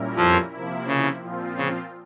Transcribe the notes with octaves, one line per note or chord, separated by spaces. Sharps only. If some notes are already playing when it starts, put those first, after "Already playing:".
Already playing: A#2 G3 C#4 E4 A#4
F2 F3
C3 F3 A#3 E4
C#3
A#2 F3 C4 F4
C#3